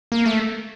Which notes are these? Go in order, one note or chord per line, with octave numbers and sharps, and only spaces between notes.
A#3
A3